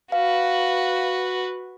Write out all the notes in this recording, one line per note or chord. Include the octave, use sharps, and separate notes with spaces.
F#4 B4 F5